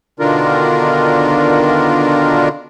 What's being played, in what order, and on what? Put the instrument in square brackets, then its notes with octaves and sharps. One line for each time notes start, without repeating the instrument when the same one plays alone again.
[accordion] B2 D3 D#3 D4 F4 A#4